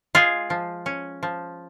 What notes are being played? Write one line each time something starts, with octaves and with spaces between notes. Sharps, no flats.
G#3 F4 G#4
F3
C#4
F3